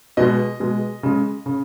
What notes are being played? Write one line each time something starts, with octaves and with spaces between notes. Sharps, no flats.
B2 G#3 D#5
B2 G#3
C#3 G#3
C#3